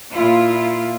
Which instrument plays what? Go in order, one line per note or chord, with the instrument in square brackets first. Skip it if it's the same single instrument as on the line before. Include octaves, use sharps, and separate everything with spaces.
[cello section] A#2 E4 F4